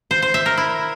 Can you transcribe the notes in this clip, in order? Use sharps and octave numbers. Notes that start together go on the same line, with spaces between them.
C5
C5
E5
A#4
E4